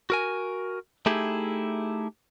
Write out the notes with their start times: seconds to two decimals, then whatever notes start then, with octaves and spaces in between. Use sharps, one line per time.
0.10 F#4 A#4 G#5
1.06 A3 D#4 E4 G4 G#4